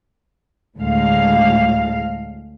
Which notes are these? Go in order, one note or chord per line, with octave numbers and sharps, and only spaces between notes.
D2 A2 G#3 F5